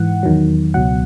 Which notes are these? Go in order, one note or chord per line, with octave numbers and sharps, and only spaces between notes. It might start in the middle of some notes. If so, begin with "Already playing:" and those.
Already playing: G#2 E3 F#5
E2 D#3 F#3
C#2 B2 F#3 F#5